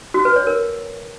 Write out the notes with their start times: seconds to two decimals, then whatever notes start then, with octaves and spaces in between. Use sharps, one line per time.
0.14 F#4
0.25 B4
0.36 C#5
0.47 A#4